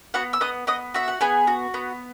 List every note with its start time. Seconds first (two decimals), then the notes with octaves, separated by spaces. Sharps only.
0.14 B3 F#4 F#5
0.33 E6
0.41 B3 D#5 D#6
0.67 B3 D#5 D#6
0.94 F#4 E5
1.08 F#5
1.21 B3 G#4 G#5
1.47 F#4
1.74 B3